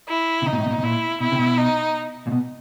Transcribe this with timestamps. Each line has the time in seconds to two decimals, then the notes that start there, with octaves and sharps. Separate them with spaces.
0.09 E4
0.42 C3
0.46 C#3 D#4
0.53 A#2
0.58 A2
0.66 B2
0.71 A#2
0.78 B2
0.83 A#2 E4
1.20 B2 E4
1.32 C3
1.39 B2
1.58 D#4
2.27 A#2
2.32 B2